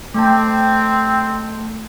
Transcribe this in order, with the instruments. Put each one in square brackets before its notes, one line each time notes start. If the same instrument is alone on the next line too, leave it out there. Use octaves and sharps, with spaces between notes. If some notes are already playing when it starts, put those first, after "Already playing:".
[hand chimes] A3 A5 [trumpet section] C4